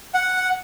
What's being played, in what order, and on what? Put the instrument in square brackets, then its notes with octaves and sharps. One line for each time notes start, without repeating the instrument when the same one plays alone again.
[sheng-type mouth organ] F#5